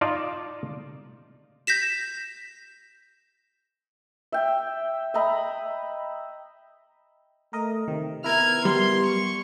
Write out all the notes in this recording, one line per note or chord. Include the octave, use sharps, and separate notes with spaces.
D#4 F4 D5 A5
G6 A#6 B6 E7
E5 G5
D#5 E5 A#5 B5
A3 A#4 D#5
C3 D#3
B3 E4 A#4 F6 G#6
G3 C6
C#6